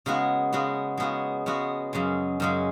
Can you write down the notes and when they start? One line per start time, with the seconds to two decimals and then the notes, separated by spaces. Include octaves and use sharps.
0.06 C#3 G#3 B3 F#4
0.53 C#3 G#3 B3 F#4
0.97 C#3 G#3 B3 F#4
1.46 C#3 G#3 B3 F#4
1.93 F#2 C#3 G#3
2.40 F#2 C#3 G#3